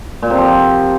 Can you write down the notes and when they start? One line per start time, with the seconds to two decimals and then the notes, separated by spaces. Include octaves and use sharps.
0.22 A#2
0.30 C3
0.38 F3